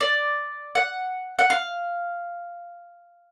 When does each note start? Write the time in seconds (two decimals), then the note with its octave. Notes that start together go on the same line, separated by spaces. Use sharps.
0.01 D5
0.75 F#5
1.39 F#5
1.50 F5